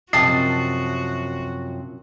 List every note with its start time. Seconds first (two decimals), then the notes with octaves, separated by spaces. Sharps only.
0.13 F#2 C3 F3 F#4 D#5 A5 C7